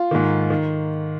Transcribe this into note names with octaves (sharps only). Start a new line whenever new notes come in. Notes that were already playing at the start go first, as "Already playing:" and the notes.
Already playing: F4
G#2 D#3
D#3